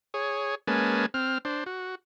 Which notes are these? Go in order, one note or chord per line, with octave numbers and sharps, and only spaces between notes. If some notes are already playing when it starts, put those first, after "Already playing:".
G#4 C#5
G#3 A#3 C#4 B4 G#5 A5
C4 F6
D4 C5
F#4